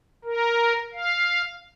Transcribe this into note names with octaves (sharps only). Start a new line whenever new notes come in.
A#4
F5